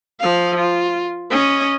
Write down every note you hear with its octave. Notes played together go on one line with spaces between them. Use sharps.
F3 F5
F4
C#4 D#5